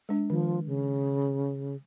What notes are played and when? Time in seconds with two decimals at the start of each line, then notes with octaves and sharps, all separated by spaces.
0.09 G#3 D4
0.30 D#3 F3
0.66 C#3